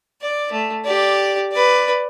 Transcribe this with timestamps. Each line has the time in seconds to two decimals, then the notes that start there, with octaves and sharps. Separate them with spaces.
0.21 D5
0.52 A3
0.84 G4 D5
1.52 B4 D5